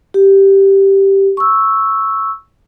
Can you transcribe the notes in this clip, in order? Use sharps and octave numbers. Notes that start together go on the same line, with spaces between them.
G4
C#6 E6